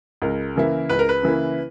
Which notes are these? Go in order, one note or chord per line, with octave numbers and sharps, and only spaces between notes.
C#2 A#4
C#3 E3 A#3 E4
C#2 B4
A#4
B4
C#3 E3 A#3 E4